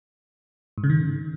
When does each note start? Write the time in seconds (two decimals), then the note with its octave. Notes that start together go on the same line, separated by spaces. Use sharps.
0.78 G#2
0.84 C#3
0.90 D#3